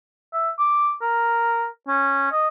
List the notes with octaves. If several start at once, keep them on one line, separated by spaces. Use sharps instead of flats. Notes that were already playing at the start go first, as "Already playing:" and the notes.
E5
D6
A#4
C#4
D#5